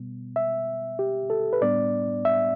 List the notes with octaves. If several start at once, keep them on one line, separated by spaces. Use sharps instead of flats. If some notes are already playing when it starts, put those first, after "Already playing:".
Already playing: B2 G3 B3
E5
G4
A4
B4
A2 G3 B3 D4 D5
E5